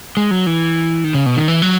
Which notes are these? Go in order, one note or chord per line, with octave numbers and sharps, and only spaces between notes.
G#3
F#3
E3
D#3
C#3
B2
D#3
E3
F#3